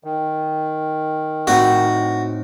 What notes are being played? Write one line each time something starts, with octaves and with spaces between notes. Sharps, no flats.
D#3
A2 C4 D#4 F#4